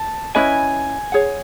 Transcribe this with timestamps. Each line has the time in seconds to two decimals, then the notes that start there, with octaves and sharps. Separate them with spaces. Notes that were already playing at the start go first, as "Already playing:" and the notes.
Already playing: A5
0.35 C#4 E4 B4 D#5 G#5
1.12 G#4 C#5 F#5